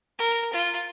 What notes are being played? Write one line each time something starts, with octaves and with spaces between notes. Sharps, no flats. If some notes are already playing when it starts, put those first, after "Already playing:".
A#4
F4